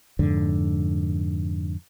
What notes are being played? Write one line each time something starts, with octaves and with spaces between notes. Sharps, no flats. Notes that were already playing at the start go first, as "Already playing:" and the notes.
F2 G#2 D3